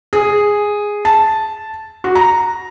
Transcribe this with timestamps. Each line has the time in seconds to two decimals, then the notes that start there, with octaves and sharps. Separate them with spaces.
0.13 G#4
1.05 A5
2.04 F#4
2.15 A#5